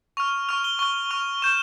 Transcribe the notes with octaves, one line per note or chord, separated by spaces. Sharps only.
C#6 F6 F7
C#6 F6 F7
G7
C#6 F6 G7
C#6 F6 F7
C#6 G6 E7